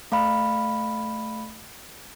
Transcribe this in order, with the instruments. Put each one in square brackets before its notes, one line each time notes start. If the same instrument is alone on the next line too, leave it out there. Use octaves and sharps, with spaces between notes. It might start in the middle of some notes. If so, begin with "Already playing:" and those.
[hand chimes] A3 F5 B5